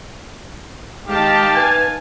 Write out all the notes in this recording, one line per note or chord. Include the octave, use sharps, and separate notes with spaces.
D#3 G#3 G4 F5 A5
B4 G#5